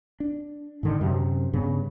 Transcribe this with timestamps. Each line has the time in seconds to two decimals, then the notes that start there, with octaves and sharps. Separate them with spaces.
0.20 D4
0.83 G#2 D3 D#3
1.01 F#2 C3
1.53 G2 C#3 B3